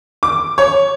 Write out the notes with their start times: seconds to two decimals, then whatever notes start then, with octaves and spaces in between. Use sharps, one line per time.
0.23 D6
0.58 C#5